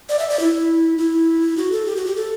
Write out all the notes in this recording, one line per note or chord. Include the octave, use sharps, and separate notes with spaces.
D5
E5
D5
E4
E4
F#4
A4
G4
F#4
G4
A4